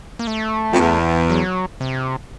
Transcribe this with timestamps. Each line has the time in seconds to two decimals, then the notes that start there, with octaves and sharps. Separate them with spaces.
0.19 A#3
0.27 A3
0.73 F2
0.79 E2
1.30 F#3
1.80 C3